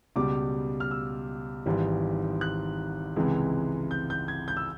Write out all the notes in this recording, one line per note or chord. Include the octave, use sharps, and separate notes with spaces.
C#2 B2 G3 D6
F6
E6
G#1 G#2 E3 G3
F#6
C#2 C3 E3 G#3
G6
G6
G#6
G6
E6